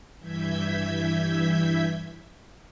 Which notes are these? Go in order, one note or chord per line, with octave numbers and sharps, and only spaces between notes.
G2 E3 E5 G6 G#6 B6